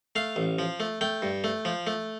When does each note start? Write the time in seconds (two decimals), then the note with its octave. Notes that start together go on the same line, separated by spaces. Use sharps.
0.16 A3 F5
0.36 A1
0.59 F3
0.80 A3
1.01 A3 G5
1.22 G2
1.44 A3
1.65 F3
1.87 A3